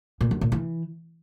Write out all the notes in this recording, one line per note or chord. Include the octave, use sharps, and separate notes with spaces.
A#2
F#2
A#2
E3